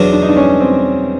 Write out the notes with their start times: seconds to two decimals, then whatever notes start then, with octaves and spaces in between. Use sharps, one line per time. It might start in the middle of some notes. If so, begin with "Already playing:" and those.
Already playing: E2 B2 F#3 D4
0.13 D4
0.22 D#4
0.29 D4
0.36 C#4
0.60 C4